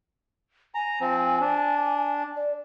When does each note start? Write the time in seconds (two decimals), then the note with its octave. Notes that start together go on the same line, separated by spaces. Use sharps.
0.75 G#5 A#5
1.01 F3 C4
1.41 D4
2.36 D5